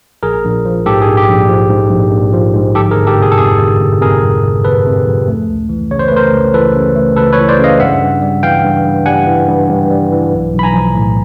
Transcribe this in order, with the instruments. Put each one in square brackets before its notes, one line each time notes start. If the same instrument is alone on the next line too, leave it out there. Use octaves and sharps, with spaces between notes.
[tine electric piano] A#1 G#4 A#4
A#1
F3
G#2 G4 A4
G#4
A#1
G4
A#1
F3
G#2
A#1
A#1
F3
G#2
G1 G4 A4
G#4 A#4
G1
G4 A4
C3 G#4
A4
F2 G#4
G1
G1
C3 G#4 A#4
F2
G1
G1 A4 B4
C3
F2
A3
C#2
E3
C#3 C#5
C5
B4
A3 A#4 C5
C#2
E3 A4 B4
C#3
A3
C#2 A4 B4
B4 C#5
E3
C5 D5
C#3
D#5 F5
G2 E5 F#5
G2
G3
E3 F5 G5
G2
G2
G3 F#5 G#5
E3
G2
G2
G3
E3
B1
B1
B5
G#5 A#5
F3
A2